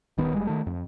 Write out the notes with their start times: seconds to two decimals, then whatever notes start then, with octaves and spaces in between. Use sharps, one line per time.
0.18 D#1 D#3 B3
0.34 F#1 G3 G#3
0.47 D#3 A3
0.67 F2